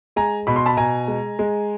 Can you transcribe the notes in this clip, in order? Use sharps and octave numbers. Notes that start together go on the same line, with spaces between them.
G#3 G#5 A#5
B2 B5
C6
A5 B5
B2 G#5 A#5
G#3
G#3